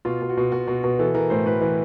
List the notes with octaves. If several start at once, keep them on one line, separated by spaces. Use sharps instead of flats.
B2 F4
B2
F#4
B2
B2 F#4
B2
B2
E3 A4
E3 A#4
A2 C5
A2 B4
E3